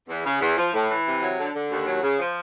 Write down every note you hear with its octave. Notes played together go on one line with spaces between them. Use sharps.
E2
C#3
E2
F3
A2
E3
C3
F#3
D3
D3
D#2
F#3
C#3
F3